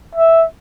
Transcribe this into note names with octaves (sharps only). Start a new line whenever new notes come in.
E5